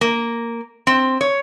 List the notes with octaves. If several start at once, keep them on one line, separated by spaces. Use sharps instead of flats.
A#3
C4
C#5